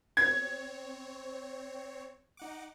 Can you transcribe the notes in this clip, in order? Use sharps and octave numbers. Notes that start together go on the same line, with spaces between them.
C4 C#5 G#6
D#4 F#5 D6